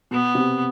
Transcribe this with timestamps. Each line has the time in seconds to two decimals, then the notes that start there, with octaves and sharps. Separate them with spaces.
0.11 B2 B3
0.35 C3